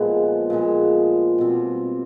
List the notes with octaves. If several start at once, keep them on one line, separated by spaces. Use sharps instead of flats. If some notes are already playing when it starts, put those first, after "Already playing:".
Already playing: A#2 F3 G#3 B3
A#2 F3 G#3 B3
B2 G3 C4